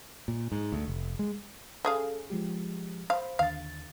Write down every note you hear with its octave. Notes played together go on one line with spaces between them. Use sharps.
A#2
G#2
D2
F1
G#3
C#3 G#4 A4 F5
F3 G#3 G4
C5 F5 B5
D#2 D3 F5 A6